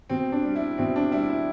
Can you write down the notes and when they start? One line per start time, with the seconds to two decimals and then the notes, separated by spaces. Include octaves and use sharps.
0.10 B2 C4
0.32 D4
0.45 G3
0.56 E4
0.78 B2 C4
0.96 D4
1.12 G3 E4
1.30 E4